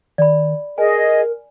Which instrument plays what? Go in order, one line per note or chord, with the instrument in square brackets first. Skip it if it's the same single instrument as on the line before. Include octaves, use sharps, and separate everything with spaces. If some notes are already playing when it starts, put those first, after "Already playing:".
[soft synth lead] D#3 [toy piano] D5 B5
[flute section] G#4 D#5 [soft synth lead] A#4 [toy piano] G#5